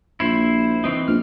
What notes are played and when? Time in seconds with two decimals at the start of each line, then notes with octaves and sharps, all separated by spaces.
0.20 A#1 E4 C5
0.84 E3 C4 D#4
1.08 A#1 F6